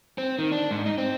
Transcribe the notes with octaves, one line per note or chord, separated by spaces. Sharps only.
C4
D#3
D4
G#2
D#4
C4